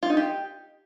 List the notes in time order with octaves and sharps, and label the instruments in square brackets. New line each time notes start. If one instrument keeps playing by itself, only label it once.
[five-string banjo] F4
D#4
G4